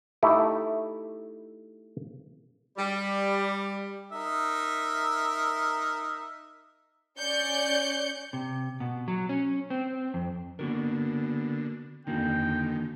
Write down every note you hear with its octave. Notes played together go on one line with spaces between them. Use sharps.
A3 D#4 E4 G4
G3
D#4 A#4 E5
C#4 D5 G6 C#7
C3
B2
F#3
C#4
C4
F2
D3 A#3 B3 F#4 A#4
F2 D3 D#3 A#3 F#4 G5